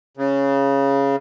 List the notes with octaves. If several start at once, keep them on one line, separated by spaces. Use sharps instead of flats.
C#3